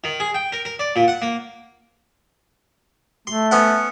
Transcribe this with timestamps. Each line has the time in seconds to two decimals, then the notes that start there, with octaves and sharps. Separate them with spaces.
0.04 D#3
0.20 G#4
0.34 G5
0.52 A#4
0.65 A#4
0.79 D5
0.96 A#2
1.08 F#5
1.22 A#3
3.27 A3 C6
3.51 B3 C#4 F#5